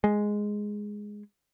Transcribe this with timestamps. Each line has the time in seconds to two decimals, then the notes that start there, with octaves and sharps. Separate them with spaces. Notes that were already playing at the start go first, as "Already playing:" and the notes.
0.04 G#3